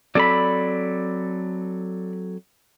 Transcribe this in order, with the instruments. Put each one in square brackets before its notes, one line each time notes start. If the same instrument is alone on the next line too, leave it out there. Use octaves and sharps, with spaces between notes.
[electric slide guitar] F#3 C4 A4 [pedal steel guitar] D5 B5